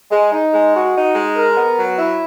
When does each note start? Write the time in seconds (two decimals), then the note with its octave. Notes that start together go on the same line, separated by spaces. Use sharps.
0.11 G#3
0.32 D#4
0.53 G#3
0.74 F#4
0.95 D#4
1.15 G#3
1.36 A#4
1.57 B3
1.78 F#3
1.98 E4